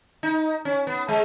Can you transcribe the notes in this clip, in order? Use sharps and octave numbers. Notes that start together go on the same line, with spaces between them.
D#4
C#4
B3
G#3